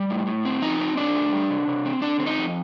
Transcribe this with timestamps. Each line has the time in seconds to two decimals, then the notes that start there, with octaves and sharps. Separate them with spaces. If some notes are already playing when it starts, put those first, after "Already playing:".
Already playing: G3
0.10 A2
0.27 A2
0.45 C4
0.62 F3 D#4
0.80 C4
0.97 A#2 D4
1.16 A3
1.33 G3
1.50 C3
1.68 C3
1.85 C4
2.02 D3 D4
2.20 C4
2.26 D#4
2.38 F2